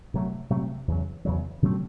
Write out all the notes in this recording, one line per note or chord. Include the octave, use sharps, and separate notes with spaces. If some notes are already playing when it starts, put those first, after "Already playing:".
C3 F#3 A3
C3 F#3 A3
E2 C#3 F#3
E2 C#3 F#3
C#3 F#3 A3 C4